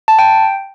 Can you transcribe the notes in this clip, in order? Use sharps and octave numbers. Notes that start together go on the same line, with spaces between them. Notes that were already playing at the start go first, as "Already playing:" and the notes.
A5
G5